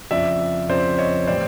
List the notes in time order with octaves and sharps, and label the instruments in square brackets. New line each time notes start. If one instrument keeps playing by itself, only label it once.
[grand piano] F2 C#3 F3 D5 E5
F2 C#3 F3 C5 D5
C#5 D#5
A2 E3 G3 C4 C5 D5